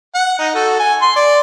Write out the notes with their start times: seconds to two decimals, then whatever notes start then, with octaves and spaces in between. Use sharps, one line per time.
0.15 F#5
0.39 D#4
0.55 F#4 A4
0.79 G#5
1.02 C6
1.16 D5